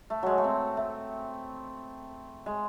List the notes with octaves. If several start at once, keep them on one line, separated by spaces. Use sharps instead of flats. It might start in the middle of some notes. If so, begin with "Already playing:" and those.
A3
F#3 G#3
A3
C4
A3
G#3